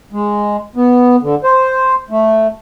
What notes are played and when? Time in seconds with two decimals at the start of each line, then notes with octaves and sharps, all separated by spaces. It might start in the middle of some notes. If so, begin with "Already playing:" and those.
0.13 G#3
0.76 B3
1.22 D3
1.44 C5
2.10 A3